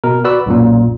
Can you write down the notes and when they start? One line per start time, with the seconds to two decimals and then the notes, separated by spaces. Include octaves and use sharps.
0.04 B2 A#4
0.24 F#4 B4 D5 B5 E6
0.46 B1 F#2 A#2